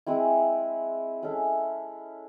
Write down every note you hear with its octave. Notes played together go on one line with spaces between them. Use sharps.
G#3 C4 E4
G#3 C#4 E4 A4